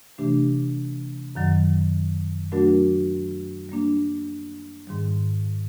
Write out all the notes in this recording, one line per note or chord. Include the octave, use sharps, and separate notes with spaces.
C3 E3 A3 D4 G4
F#2 D#3 F#3
F#3 A3 D4 F#4 A#4
G3 A#3 D4
G#2 D#3 G3